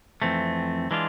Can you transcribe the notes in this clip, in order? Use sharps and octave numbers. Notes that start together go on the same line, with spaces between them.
F2 E3 A3 C4
E3 G#3 D4 F4